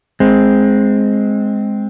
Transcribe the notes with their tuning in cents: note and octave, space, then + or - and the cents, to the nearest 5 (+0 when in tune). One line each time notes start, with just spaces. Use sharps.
G#3 +10 C4 +0